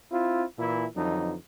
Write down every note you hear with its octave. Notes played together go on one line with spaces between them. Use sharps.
C4 E4 F4
A#2 E3 E4
F2 D3 E3 F#3 D#4